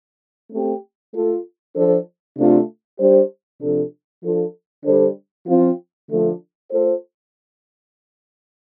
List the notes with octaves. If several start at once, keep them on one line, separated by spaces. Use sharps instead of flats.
A3 C4 G4
A3 F4 A4
F3 D4 A4 C5
C3 A3 D4 F4 A4
G3 D4 G4 C5
C3 F3 D4 A4
F3 D4 F4 A4
D3 G3 D4 A4 C5
F3 C4 F4
D3 F3 A3 D4
A3 F4 A4 C5